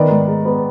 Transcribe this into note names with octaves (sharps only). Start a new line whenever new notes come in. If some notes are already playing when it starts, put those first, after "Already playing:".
Already playing: D#3 B3 A#4 D5
G#2
G#3
B3